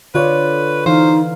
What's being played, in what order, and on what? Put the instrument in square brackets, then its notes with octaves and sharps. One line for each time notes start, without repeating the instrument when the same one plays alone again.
[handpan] D3 D5 [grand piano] F4 C#5 [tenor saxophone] B4
[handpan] E3 F5 [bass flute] D#4 [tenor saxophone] C5